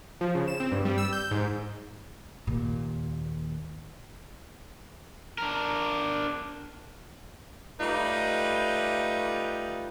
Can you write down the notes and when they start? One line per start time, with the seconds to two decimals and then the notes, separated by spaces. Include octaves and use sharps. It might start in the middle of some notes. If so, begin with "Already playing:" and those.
0.21 F3
0.35 C#3
0.48 E7
0.60 C4
0.72 G2
0.85 G3
0.98 E6
1.13 G6
1.31 G#2
2.47 D#2 A#2
5.38 D4 A#4
7.81 G3 A3 D#4 F4 B4